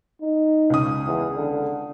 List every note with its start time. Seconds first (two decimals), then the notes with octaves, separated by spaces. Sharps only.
0.21 D#4
0.70 C#2 D#6
1.06 E2
1.36 D3